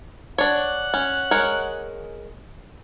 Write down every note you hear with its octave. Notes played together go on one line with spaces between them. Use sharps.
D4 C#5 F#5
C#4
G#3 A#4 C#5